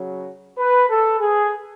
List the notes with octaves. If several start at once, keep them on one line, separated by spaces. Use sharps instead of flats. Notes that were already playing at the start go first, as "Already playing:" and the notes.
Already playing: C#3 F#3
B4
A4
G#4